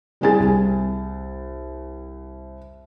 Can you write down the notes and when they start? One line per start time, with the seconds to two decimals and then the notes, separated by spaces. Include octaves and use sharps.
0.21 G3 C4 E4 G#4 G#5 A6
0.40 C2